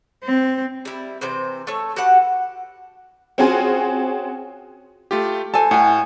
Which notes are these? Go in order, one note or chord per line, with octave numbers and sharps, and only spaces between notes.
C4
G3 E4
C3 E3 C5
A3 A4 C#5
F#4 G4 B4 F#5
C4 C#4 F4 F#4 G#4 G#5
A3 F4 G4
A4 C5 G#5 A5
A2 F#5 G#5